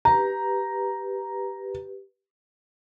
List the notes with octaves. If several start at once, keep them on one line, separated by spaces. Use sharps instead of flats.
G4 B4 A#5